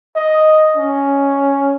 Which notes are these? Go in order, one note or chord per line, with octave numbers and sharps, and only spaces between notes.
D#5
C#4